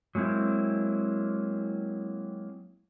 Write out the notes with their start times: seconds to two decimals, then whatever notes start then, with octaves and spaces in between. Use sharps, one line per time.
0.15 F#3 G#3 A#3 C4 E4